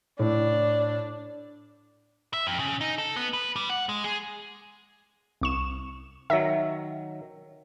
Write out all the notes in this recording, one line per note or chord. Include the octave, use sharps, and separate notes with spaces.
A2 D4
E5
F2
C#3
D#4
A4
B3
B4
G3
F#5
G#3
G#4
C2 C#6 E7
D#3 F#3 E5 A#6